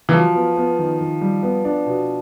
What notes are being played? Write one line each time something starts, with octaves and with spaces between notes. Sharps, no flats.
E3
F3 F#3
B3
B3
D#3
D#3
G3
B3
D4
B2